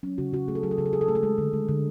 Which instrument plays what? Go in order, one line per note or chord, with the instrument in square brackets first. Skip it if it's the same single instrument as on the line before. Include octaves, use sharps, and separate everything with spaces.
[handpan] F#3 C#4
C#3 F#4
C#3 F#4
A3 G#4
A4
F#3 G#4
A4
C#3 G#4
A4
C#3 G#4
A4
A3 G#4
A4
G#3 G#4
D3
G#3
D3